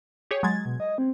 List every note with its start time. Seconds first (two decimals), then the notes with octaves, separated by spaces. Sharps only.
0.31 G4 G#4 C#5
0.43 F#3 G#3 G#6 A6
0.65 B2
0.80 D#5
0.98 C4